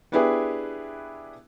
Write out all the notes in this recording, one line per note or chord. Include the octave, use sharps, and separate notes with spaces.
B3 D4 E4 G4 G#4 B4